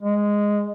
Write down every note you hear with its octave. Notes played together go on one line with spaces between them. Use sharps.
G#3